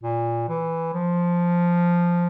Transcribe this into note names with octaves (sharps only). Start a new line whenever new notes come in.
A#2
E3
F3